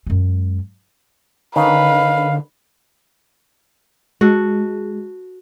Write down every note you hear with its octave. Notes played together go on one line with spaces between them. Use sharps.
F#2 G#3
D3 D#3 C#4 D#4 B4 F5
G#3 F#4 A4